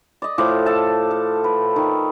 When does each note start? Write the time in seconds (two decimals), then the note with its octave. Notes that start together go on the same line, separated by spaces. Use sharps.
0.22 D5 D#5
0.38 A2 F3 D6
0.66 A4 A5
1.11 A4
1.44 B4
1.76 D#3